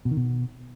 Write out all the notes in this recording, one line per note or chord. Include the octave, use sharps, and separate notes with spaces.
B2
D#3
B2